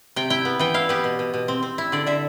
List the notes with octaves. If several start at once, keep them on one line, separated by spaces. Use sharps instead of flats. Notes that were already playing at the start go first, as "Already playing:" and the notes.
C3 G5
E4 G5
B3
E3 G5
E4 F5
B3 G4
B2
B2
B2
C4
C4
E4
D3 D5
D3 E5